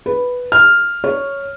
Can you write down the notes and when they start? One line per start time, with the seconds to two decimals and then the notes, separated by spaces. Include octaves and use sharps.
0.06 B4
0.52 F6
1.04 C#5